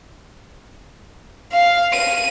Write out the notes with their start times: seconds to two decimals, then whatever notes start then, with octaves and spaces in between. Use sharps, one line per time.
1.52 F5
1.93 D#7